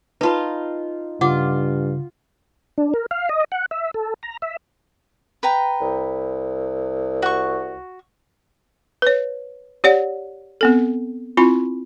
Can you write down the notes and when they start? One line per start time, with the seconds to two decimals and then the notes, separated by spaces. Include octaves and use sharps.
0.21 D#4 F4 B4 A5 B5
1.21 G2 C#3 F4 F#5 D6
2.78 D4
2.94 A#4
3.11 F5
3.29 D#5
3.52 F#5
3.71 E5
3.94 A4
4.23 A#5
4.42 E5
5.43 B4 G5 A#5
5.81 C2
7.22 F#4 C#6
9.02 B4 C#5
9.84 G4 C#5 D5 F#5
10.61 B3 C4 A4
11.37 C4 E4 F4 B5